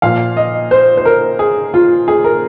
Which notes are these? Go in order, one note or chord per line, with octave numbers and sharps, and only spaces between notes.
A#2 F3 F5
D#5
C5
C5
A#4
G#4
F4
G#4
A#4